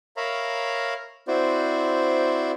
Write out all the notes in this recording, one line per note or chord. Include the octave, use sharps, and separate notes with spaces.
A#4 C#5 E5 F5 A#5 B5
C4 E4 F#4 C5 D5